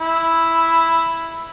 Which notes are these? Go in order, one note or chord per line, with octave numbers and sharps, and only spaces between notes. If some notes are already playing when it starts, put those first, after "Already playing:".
E4